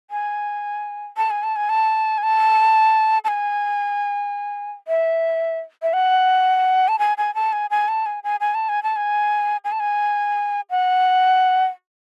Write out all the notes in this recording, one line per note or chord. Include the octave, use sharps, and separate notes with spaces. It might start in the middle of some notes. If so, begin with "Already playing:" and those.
G#5
A5
G#5
A5
G#5
A5
G#5
A5
A5
G#5
E5
E5
F#5
A5
G#5
G#5
A5
G#5
G#5
A5
G#5
G#5
G#5
A5
G#5
A5
G#5
G#5
A5
G#5
F#5